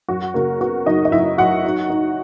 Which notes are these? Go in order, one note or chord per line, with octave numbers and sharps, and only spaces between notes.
F#2 F#4
C#3 A#3 A#4
B3 F#4
F#2 D#4 D#5
D#5
F#2 E4 E5
F#3 F#4 F#5
D#4
D#4